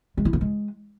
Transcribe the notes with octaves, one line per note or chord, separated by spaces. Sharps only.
G#3
E4
B3
G#3